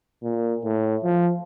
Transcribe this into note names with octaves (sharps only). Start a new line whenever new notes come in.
A#2
A2
F3